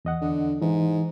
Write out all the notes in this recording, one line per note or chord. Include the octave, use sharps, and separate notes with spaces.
E2 D#5 F#5
D3
G#2 E3